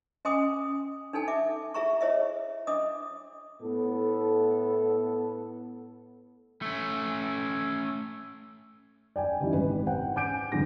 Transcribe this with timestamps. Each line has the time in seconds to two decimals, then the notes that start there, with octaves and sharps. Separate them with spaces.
0.25 C#4 D#5 G#5 C6 D6 D#6
1.13 D4 D#4 A4 G#5 A5
1.28 E5 D6
1.74 E4 G#4 E5 A#5 C#6
2.01 E4 C#5 D#5 E5
2.67 D4 D#5 D6 D#6
3.62 A2 B3 A4
6.62 A3 C#4
9.16 D5 G5 G#5
9.40 C#3 E3 G3 D#4
9.53 G#1 B4
9.87 C5 F#5 G5
10.16 G#5 D6 G6 D7
10.52 F1 G#2 D3 A#6